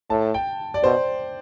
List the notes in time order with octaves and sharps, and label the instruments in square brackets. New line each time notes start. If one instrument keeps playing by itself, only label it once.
[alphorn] A2 [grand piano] A5
[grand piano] G5
D5
[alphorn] B2 [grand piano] C5